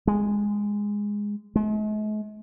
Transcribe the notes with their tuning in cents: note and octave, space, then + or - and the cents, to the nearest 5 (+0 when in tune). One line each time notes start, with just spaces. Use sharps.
G#3 -10
G#3 +45